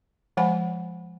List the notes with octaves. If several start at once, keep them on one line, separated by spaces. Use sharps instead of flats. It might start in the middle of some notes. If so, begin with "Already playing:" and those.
F3 G#3 C5 F#5 G#5 B5